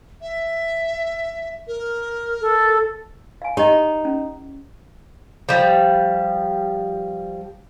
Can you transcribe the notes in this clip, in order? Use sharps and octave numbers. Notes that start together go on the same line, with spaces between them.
E5
A#4
A4
F5 G#5
D#4 G4 D#5
C#4
F3 G3